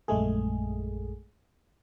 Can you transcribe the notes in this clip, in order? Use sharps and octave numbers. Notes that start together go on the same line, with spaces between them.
A#1 F#2 G#3 A3 G#4